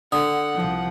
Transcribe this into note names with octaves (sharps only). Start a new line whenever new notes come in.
D3 F#5 D#6
C2 F3